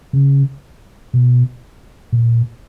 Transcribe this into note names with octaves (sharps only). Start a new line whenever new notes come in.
C#3
B2
A#2